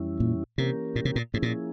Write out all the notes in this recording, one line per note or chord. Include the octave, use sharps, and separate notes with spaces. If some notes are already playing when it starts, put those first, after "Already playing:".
Already playing: F2 E3 G3 C#4 E4
A#2
C3 E3 A#3 C#4 G4 A#4
A#2
C3
A#2
G#2 F3 A#3 C#4 E4 G#4
A#2